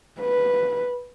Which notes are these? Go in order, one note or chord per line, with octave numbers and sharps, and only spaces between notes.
B4